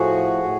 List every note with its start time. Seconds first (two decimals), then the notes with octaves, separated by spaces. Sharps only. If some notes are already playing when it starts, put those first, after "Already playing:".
Already playing: A2 F3 F#4 G#4
0.43 A2